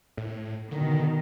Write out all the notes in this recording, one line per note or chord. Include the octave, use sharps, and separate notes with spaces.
A2
B2 D3 D#3